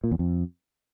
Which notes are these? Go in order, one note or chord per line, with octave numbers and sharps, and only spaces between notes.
A#2
E2
F2